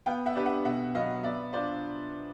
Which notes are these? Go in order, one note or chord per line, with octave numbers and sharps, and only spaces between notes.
B3 F5 G5
E5 F#5
D4 G4 B4
E5 F#5
B2 E5 F#5
F#3 B3 D#5 F5
B3 D5 E5
D4 F4 C5 D5